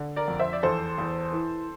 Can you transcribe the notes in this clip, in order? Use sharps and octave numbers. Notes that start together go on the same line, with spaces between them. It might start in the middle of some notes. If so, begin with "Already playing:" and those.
Already playing: D3
A#4 D5
F2
C5 E5
D5
E2 A4 C5
E2
E3